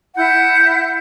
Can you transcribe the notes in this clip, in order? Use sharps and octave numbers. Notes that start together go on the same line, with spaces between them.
E4 F#5 G6